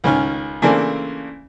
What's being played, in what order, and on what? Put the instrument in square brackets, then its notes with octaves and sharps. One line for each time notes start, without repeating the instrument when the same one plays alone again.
[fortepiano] C#2 D#3 C#4 G#5 F6
C#3 E3 A3 A#3 C4 D4